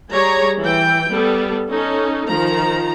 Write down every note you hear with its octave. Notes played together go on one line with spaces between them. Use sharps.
G3 G#4 C#5 A#5
E3 G5
G3 B3 A4
C#4 D#4 A4
D#3 F3 A#5